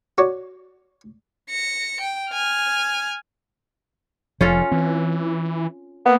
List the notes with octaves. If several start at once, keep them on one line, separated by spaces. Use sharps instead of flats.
F#4 C#5 D5
A#6 C#7
G5
G#5 F6
F1 F3 C#4 F4 A4
E3 C4
A#3 B3